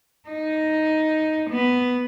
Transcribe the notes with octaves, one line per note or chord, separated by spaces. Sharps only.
D#4
B3